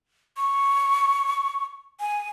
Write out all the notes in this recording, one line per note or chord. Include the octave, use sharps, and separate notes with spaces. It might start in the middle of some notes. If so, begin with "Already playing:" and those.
C#6
G#5